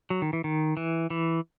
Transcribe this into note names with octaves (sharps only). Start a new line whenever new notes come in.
F#3
D#3
E3
D#3
E3
E3